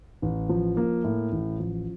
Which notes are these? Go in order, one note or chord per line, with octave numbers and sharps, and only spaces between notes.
A1
F3
A#3
A2
A1
F3